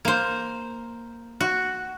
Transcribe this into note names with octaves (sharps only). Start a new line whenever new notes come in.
A#3 C5
F#4